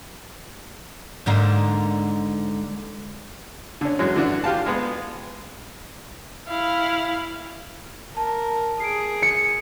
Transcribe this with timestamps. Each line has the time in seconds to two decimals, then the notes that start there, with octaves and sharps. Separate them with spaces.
1.26 G#2 D3 A#3
3.81 D3 C#4
3.99 F#2 E3 F#3 G#3
4.16 D3 E3 D4 F#4
4.44 F4 G4 F5 A5
4.66 G#3 B3
6.48 E4 F5
8.17 A#4 A5
8.80 G#4 C7 D7
9.22 C#7